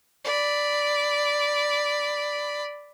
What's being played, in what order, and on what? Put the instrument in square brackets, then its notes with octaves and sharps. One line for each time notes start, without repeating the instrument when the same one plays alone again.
[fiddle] D5 B5